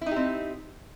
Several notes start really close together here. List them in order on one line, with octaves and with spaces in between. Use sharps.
E4 D#4 G4 C4